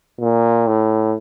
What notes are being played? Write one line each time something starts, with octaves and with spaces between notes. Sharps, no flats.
A#2
A2